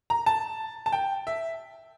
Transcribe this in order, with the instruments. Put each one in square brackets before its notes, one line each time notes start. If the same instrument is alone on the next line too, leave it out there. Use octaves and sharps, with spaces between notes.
[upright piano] A#5
A5
A5
G5
E5